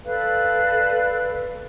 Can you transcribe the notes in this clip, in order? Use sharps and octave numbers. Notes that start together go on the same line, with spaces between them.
A4 B4 D5 F5